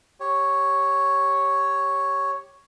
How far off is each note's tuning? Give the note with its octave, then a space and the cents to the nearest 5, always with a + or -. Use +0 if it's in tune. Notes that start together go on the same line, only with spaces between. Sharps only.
G4 +0 C#5 +0